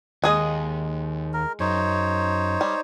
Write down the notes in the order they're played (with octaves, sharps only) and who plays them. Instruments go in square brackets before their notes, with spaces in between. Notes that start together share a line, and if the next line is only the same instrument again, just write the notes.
[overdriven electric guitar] D#2 [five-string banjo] G#3 G#4 D#5
[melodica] A#4
[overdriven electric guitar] F#2 [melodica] D#4 C5 C#5
[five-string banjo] G3